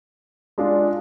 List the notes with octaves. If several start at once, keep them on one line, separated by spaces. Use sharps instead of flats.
G#3 D4 F4